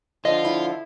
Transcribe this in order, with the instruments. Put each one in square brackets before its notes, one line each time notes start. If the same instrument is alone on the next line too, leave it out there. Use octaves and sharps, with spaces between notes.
[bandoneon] D3 F3 [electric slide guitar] F4 [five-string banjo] D#5
[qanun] E4